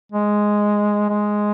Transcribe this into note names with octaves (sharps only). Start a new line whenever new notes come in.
G#3
G#3